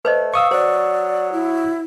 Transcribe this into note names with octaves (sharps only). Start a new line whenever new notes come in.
A3 B4 C5 D#5
F5 C#6 D#6 E6
F#3 C5 D5
E4